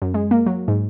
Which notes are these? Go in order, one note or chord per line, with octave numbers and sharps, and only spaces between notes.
F#2
G#3
A#3
F#3
G#2